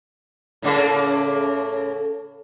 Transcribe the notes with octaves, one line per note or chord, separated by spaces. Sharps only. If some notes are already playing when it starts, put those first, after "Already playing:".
A2 C#3 A#3